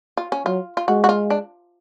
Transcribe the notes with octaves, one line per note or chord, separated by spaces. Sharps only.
F4
C#4
F#3 F4
F4
G#3 F#4
F#4
F4
D4